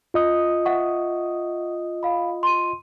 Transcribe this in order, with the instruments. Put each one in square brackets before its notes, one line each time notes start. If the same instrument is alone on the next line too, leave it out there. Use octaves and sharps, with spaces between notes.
[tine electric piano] F4 D#5 D#6
[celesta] E5 F#5 C#6
F5 B5
C6 D#7